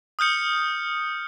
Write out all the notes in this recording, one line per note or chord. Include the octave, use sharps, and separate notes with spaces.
D#6 F6 G6 C#7